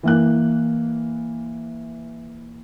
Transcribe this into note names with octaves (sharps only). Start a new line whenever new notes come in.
E3 A#3 F#6